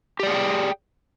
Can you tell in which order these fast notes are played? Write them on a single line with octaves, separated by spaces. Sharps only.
G4 D5 G#4 F#5 G5